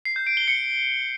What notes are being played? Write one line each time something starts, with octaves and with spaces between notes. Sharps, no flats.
C7
G6
D7
G7
C#7